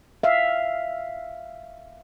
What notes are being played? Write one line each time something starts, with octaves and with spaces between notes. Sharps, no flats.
E5 F5